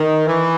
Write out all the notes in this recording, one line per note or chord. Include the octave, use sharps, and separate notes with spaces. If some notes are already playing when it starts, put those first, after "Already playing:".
Already playing: D#3
E3